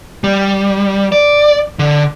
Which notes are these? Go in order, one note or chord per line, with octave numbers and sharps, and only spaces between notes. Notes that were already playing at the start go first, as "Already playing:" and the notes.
G3
D5
D3